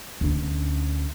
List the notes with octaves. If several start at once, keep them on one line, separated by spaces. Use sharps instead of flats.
D2 C#4